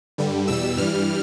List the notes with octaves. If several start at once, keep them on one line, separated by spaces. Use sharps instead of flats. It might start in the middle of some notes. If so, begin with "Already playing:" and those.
G2 D3 G3
E2 B2 G3 E6
G2 E3 G3 F6